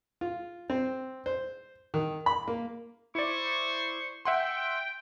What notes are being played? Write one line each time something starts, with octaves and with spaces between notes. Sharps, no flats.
F4
C4
C5
D#3
B5
A#3
E4 C5 D5 C#6
E5 F#5 G5 C6